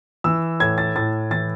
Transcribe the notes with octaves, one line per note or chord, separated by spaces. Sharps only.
E3 E6
A2 G#6
A6
A2 A6
E3 A6